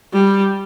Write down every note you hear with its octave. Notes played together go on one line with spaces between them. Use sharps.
G3